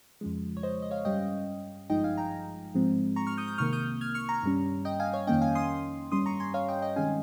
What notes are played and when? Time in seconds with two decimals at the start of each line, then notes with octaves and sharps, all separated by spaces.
0.21 F2 C#3 F3 G#3
0.57 C#5
0.63 C5 D#5
0.82 D#5
0.91 C#5 F5
1.05 G2 G3 C#4 D#5 G5
1.89 G#1 G2 F3 G#3 D#4 D#5 G5
2.04 F5 G#5
2.17 G5 A#5
2.74 G#2 F3 G#3 C4
3.16 A#5 C#6
3.27 C#6 F6
3.37 D#6 G6
3.48 D#6 G6
3.58 C2 C3 D#3 A#3 C#6 F6
3.73 D#6 G6
4.01 F6 G#6
4.14 C#6 F6
4.29 A#5 C#6
4.43 G2 G3 C#4
4.85 D#5 G5
5.00 F5 G#5
5.13 C#5 F5
5.27 F2 D#3 A#3 C#4 D#5 G5
5.41 F5 G#5
5.55 C6 D#6
6.12 G2 G3 C#4 C6 D#6
6.26 A#5 C#6
6.40 G#5 C6
6.54 C#5 F5
6.68 D#5 G5
6.82 D#5 G5
6.96 C3 D#3 G#3 C#4 F5 G#5